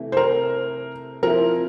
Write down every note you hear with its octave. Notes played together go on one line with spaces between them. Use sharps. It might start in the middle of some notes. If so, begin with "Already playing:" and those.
Already playing: C3 E3 A3 E4
C5
A#4
F3 C4 E4 A#4